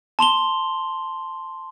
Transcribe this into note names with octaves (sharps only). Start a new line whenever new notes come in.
A5 C6 F7 G7